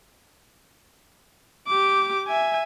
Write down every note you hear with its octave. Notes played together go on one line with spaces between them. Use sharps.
G4 D6
E5 G#5